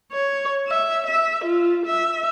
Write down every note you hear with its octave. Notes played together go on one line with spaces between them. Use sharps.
C#5
E5
E5
F4
E5